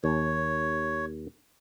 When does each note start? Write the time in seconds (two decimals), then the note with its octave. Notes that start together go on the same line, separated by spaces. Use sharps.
0.04 D#2 C#5